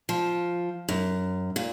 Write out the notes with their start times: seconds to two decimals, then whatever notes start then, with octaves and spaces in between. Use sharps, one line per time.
0.09 F3
0.89 F#2
1.56 A#2